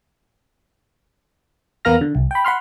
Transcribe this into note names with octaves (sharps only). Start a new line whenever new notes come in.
E2 B3 A#4 F5 F6 A#6
D3
C2
G5 B5
F#5 B5 C6 F6